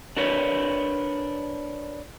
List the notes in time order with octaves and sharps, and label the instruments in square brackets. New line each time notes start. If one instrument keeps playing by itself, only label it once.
[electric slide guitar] D4 A#4 B4 C#5